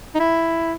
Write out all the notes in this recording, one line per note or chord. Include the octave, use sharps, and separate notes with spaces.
D#4
E4